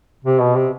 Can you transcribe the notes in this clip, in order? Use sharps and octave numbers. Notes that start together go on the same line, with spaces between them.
C3
B2
C3